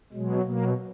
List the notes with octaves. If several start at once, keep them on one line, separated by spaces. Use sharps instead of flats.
B2 F#3 G#3
B2 F#3 A#3